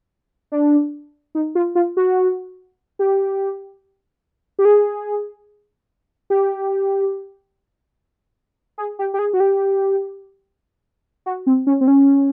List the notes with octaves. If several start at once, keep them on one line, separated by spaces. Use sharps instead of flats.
D4
D#4
F4
F4
F#4
G4
G4
G#4
G4
G#4
G4
G4
G#4
F#4
G4
F#4
C4
C#4
C4
C#4